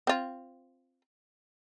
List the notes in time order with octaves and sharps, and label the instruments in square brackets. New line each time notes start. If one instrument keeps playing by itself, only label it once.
[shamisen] C4 F4